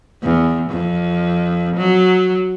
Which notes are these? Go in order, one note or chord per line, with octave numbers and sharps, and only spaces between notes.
E2
F2
F#3